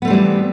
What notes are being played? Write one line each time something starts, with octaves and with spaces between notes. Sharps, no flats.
E3 G3 A3 B3 C4